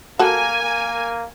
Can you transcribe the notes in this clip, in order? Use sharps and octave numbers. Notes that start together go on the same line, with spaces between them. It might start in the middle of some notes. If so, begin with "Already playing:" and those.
A#3 F#4 A4 A#4 G#5
A#3